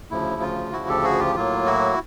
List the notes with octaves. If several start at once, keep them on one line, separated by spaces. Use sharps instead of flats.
D2 C#3 F3 E4
F4
D2 C#3 F3 E4 F#4
G4 A4
F#4 G#4
F4 G4
A2 F#3 A#3 F4
E4 F#4